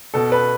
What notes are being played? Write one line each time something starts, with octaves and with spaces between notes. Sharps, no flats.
B2 A4
B4